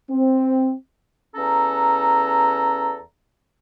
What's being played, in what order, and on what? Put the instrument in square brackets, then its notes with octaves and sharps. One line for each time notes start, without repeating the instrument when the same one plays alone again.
[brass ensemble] C4
[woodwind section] E2 C#4 A4 A#5